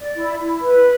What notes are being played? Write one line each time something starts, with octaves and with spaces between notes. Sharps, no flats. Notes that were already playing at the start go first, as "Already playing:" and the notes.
Already playing: D5
E4
E4
B4